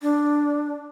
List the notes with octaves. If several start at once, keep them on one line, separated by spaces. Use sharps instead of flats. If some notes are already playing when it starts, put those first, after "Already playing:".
D4